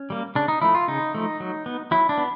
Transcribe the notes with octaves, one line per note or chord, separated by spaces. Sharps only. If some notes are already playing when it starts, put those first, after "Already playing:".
Already playing: C#4
G3 A#3
C#3 D4
D#4
F3 A3 E4
F4
C#3 D#4
F3 A3
F#3
B3
F#3 E4
D4
B3